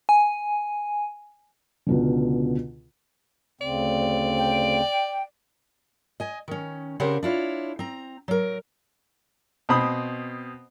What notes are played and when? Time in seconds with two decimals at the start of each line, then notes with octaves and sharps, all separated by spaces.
0.09 G#5
1.86 C#2 B2 D3
3.61 D2 C#3 C4 D5
4.37 G5
6.20 D#5 G#5
6.48 D#3 C#4
7.00 C#3 C4 G4 A#4 C5 F#5
7.23 D4 E4 F4 C#5
7.79 C4 A#5
8.28 F#3 A#4
9.69 B2 C4 C5 B5 D#6